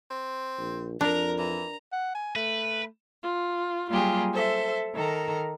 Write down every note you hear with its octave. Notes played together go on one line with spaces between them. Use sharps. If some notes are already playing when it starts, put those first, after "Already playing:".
C4
A#1
F2 D4 A#4 A#5
E3 A#5
F#5
G#5
A3 B4
F4
F#3 G3 A#3 F4 G4 G#4
A4 C5 E5
D#3 A4 A#4 A#5